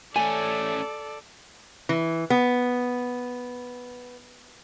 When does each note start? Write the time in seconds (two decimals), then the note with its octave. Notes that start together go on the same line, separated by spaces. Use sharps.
0.16 A3 C#4 A4 D5 G#5
1.89 E3
2.30 B3